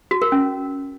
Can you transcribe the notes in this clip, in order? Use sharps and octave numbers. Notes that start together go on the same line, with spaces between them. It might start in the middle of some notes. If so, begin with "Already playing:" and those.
F#4
A#4
C#4